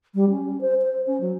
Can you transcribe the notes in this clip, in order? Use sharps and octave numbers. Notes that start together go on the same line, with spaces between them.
G3
C#4
C5
C5
C#4
F#3